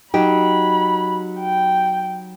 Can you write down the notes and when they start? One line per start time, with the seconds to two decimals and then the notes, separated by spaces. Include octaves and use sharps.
0.14 F#3 D#4 G4 B5
1.40 G5